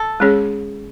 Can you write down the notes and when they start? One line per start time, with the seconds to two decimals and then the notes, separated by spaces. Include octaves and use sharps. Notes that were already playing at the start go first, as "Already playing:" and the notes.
Already playing: A4
0.20 G#3 C#4 G#4 C#5